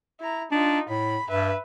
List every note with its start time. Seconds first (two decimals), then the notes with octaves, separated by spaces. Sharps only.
0.20 E4 A#5
0.51 D4 D#4 F4
0.89 A2 B5
1.29 G2 B4 E5